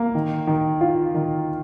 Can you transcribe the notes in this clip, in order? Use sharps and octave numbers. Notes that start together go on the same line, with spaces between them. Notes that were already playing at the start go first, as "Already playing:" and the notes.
Already playing: A#3
D#3
D#3
F4
D#3